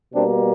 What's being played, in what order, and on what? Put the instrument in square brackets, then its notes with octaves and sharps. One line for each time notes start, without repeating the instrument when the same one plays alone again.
[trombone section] B2 G3 A#3 C4 D4